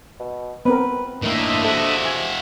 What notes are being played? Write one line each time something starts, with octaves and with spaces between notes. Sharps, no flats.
B2
B3 C4 A#4 B4
A2 D#3 A#3 D4 D#5 E5
C3 E4 F#4 A4
G#5